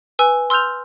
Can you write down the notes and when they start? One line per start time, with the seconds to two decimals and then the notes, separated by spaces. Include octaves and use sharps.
0.19 B4 G#5 E6
0.50 C6 E6 F6 G6 F7